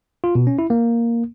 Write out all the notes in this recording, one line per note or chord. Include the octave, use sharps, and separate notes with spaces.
F4
B2
C#4
E4
A#3